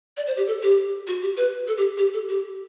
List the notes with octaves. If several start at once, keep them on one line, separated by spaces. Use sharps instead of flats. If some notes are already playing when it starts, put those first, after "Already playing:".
D5
C5
G4
A4
G4
F#4
G4
B4
A4
G4
G4
A4
G4